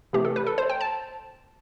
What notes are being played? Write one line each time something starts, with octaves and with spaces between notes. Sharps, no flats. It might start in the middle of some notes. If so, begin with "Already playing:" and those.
C3 E3 A3 G4
A4
B4
A4
C5
G5
A5